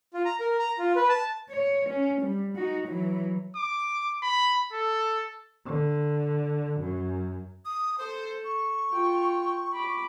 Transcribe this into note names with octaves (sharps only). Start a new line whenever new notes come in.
F4
A#5
A#4
A#5
F4
B4
A5
C#5
C#4
G3
D#4 F#4
E3 F#3
D6
B5
A4
D3
F#2
D#6
A4 C5
C#6
F4 G5
B5 D6